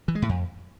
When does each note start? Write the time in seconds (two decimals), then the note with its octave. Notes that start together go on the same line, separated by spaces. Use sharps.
0.08 E3
0.15 G#3
0.22 A2
0.29 F2